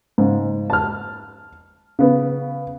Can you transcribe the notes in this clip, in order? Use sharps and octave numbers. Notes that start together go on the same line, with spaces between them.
G#2 C#3
A5 F6
C#3 B3